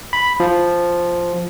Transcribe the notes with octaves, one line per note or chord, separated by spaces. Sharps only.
B5
F3